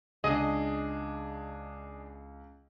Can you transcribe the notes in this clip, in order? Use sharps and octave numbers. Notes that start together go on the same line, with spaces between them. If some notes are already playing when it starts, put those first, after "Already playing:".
C#2 D4 G#4 D#5